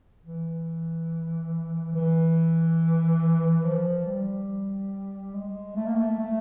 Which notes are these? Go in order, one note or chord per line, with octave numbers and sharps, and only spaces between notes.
E3
E3
F3
G3
G#3
A3
A#3
A3
A3